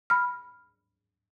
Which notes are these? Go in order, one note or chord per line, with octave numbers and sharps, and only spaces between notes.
B5 F6